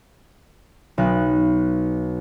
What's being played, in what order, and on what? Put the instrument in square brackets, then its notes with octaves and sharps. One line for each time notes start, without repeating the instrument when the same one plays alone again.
[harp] B1 D#4 F#6